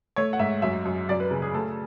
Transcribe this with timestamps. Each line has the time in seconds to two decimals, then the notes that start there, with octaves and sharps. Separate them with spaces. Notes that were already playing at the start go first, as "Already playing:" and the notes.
0.16 A3 C#5
0.33 F#5
0.39 G#2 E5
0.62 F#2 E5
0.85 F#2
1.09 F#2 D5
1.20 B4
1.31 C#3
1.42 G#4
1.54 A3 A4